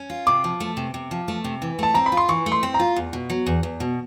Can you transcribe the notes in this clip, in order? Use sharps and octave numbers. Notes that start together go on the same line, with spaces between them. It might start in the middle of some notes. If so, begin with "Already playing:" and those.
Already playing: C#4
F4
C3 D6
F3
A3
C3
C3
F3
A3
C3
E3
A3 A5
C4 A#5
B5
F4
C6
E3 C#6
A3
C6
C4
A#5
F4
E2
B2
F#3
E2
E2
B2